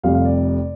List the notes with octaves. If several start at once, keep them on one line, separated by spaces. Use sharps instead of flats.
F1 F2 C3 G3 F5
F5
D5